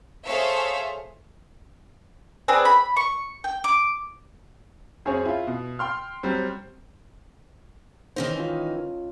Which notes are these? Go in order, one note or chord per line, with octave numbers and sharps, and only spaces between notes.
G#4 A4 C5 C#5 E5 F5
C4 D4 G#4 B4
B5
C#6
G5
D6
F#2 C4 C#4 G#4 C5 C#5
E4 F4
B2
G5 C6 F6
F#3 G3 C4
D#3 E3 C#4 D#4 C5
C#4 F4